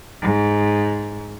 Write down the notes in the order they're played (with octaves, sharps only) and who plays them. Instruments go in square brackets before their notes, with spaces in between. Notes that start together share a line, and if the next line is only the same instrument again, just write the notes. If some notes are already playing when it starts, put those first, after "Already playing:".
[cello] G#2